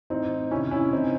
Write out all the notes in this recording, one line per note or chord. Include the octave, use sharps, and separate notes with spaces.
A2 E3 C4 D#4
C3 D#3 C#4 E4
C#4 E4
C3 E3 C4 D#4